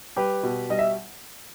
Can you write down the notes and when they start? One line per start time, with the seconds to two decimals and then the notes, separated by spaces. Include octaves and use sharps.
0.16 G3 G4 B4
0.43 B2
0.69 G3 D#5
0.79 E5